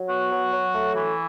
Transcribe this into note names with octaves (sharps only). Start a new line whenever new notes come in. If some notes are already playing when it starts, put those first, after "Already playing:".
Already playing: F#3
B3 F#4
F#3
F#3
A3
E3